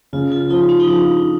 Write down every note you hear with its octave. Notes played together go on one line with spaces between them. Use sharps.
C#3 F4
F4
F3 D#4
C#4
D#4
F3 D4